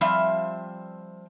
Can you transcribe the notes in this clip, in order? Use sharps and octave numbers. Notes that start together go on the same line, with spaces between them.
F3 G3 C4 E5 F5